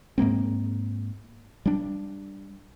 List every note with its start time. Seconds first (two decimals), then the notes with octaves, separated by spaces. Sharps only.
0.18 G#2 G#3 A#3 C4
1.66 G3 D4